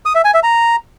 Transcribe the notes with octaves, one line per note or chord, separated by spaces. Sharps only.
D#6
E5
G#5
E5
A#5